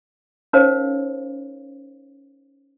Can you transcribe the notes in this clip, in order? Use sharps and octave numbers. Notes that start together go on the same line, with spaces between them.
C#4 D#4 A#4 C5 C#5 F5